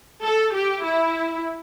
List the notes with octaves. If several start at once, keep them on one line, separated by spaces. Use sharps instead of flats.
A4
G4
E4